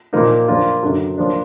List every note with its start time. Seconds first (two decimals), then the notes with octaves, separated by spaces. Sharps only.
0.13 A#2 F3 A#3 D#4
0.48 F3 A#3 D4 F4
0.83 F#2 D3 F#3
1.18 F3 A#3 D4